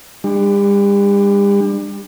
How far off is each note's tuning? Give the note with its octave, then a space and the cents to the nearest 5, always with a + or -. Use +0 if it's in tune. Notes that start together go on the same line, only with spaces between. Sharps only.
G3 +40 D4 +25